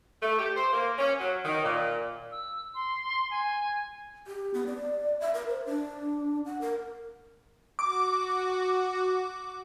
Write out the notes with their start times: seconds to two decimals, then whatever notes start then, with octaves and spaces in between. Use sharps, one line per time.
0.22 A3
0.39 G4
0.56 C5
0.73 A#3
0.98 C#4
1.20 F#3
1.45 D#3
1.64 A#2
2.31 E6
2.74 C6
3.31 G#5
4.27 G4
4.54 B3
4.66 D5
5.20 E5
5.34 A#4
5.48 C5
5.66 D4
6.46 F#5
6.61 A#4
7.79 F#4 D6